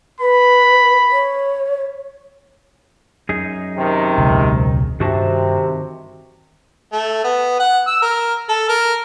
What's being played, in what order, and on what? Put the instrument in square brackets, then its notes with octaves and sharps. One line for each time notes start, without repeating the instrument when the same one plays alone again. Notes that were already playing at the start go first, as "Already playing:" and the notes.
[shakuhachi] B4 [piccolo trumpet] B5
[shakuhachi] C#5
[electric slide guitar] F#2 D#4 G#4
[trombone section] C3 D#3
[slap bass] E1 C#2
[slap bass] G2 [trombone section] C3 [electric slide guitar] D#3 F#4 A5
[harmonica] A3
B3
F#5
E6
A#4
A4
A#4